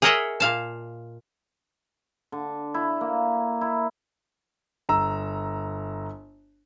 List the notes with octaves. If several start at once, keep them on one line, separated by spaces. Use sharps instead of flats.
G#4 A#4 C#5 D#5 E5 F#5
A#2 F5 A5
D3
E4
A#3
E4
G1 A#5 E6